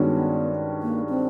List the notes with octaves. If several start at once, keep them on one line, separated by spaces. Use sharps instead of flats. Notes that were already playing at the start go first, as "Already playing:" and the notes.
Already playing: G2 D#3 G#3 B3 C#4 F#4
A#3
C4